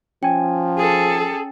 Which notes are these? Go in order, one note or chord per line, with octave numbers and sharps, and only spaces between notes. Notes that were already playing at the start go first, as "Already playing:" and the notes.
F3 C#4 G5 G#5
G#4 A4